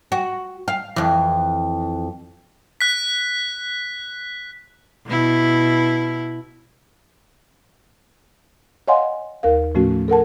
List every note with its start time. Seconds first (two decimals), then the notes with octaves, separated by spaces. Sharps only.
0.12 F#4
0.68 F5
0.96 F2 E3
2.81 F#6 B6
5.06 B2 E4
8.88 C#5 D#5 F5 F#5 G#5 C6
9.43 D#2 A#4 F5
9.75 A2 F3 A3 C#4 F#4
10.08 A4 A#4 F#5 A5